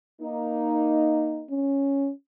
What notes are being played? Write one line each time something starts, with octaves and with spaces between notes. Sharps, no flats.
A#3 D#4
C#4